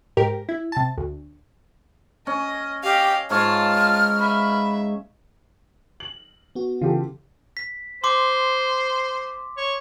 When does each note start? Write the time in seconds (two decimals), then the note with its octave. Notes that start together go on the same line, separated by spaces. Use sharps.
0.17 G#2 G4 A#4
0.49 E4
0.72 C3 A5
0.98 D2
2.27 C#4 D#5
2.84 G4 D#5 F5
3.30 G#2 F4 C#5 F5 A5 F6
4.20 E5 B5
6.00 F#7
6.55 B3 F#4
6.81 C#3 E3 F4 G4 A4
7.57 B6
8.04 C5 C6 D6
9.57 C#5